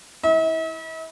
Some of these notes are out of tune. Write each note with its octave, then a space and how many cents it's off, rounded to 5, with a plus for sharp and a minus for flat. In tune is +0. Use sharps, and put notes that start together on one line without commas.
E4 -20 E5 -45